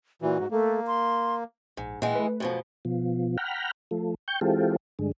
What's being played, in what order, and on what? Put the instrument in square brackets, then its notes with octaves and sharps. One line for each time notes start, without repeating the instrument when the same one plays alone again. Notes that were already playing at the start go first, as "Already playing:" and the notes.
[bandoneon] A#2 E3 [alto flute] F#4
[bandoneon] G#2
[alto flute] A3 [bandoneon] A#3
[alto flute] C6
[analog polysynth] A#1 [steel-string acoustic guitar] G#2
[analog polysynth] A#2 F#5 G5 [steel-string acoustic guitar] E3 G#3
[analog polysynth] A3 B4
[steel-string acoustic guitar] F#2 B2 F3
[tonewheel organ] B2 F3
F#5 G5 A#5 B5 F6
F3 A3
G5 C#6 G6
E3 G#3 C4 F4 G4 A4
G2 D3 G#3